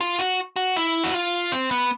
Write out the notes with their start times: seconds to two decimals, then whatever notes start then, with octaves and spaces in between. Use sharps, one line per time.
0.01 F4
0.19 F#4
0.56 F#4
0.77 E4
1.04 F#4
1.14 F4
1.52 C4
1.71 B3